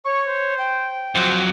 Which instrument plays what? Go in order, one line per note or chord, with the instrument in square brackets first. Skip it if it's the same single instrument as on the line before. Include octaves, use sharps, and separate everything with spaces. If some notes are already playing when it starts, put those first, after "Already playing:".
[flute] C#5 [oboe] C#6
[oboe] C5
[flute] G5
[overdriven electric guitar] F2 F#3 [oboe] C5